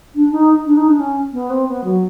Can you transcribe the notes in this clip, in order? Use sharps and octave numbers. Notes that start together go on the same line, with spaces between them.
D4
D#4
D4
D#4
D4
C#4
B3
C4
B3
F#3